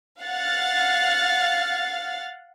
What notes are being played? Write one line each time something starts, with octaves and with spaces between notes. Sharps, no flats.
F5 F#5 F6 A6